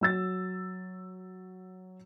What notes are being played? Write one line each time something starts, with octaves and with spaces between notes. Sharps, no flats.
F#3 E6 A6